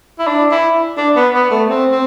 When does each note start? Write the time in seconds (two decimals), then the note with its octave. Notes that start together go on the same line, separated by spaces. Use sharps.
0.19 E4
0.27 D4
0.51 E4
0.97 D4
1.16 B3
1.33 B3
1.51 A3
1.69 C4
1.92 C4